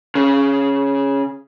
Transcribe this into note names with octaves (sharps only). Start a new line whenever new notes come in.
C#3